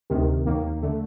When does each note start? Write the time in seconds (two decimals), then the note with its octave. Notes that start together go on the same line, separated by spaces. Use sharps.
0.10 D2 C3 D#3
0.46 D#2 D#3 A#3
0.82 D3 A3